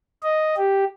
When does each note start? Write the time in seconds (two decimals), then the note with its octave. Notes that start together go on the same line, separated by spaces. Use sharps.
0.23 D#5
0.57 G4